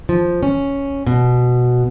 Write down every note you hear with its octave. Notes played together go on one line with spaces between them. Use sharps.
F3
C#4
B2